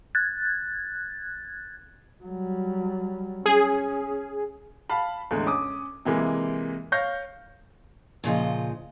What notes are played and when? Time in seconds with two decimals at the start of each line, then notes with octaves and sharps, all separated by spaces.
0.15 F#6 G#6 A6
2.24 F#3 G3
3.46 C#4 G#4
4.90 F5 A5 B5
5.31 E2 A2 D3 G#3
5.46 C#4 D6 D#6
6.05 C3 E3 G#3 A#3
6.92 C#5 F5 G6 A#6
8.24 A#2 C#3 F3 D#5